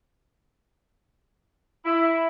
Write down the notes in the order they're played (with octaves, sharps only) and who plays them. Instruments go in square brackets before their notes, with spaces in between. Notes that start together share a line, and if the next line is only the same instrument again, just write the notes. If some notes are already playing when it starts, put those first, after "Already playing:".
[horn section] E4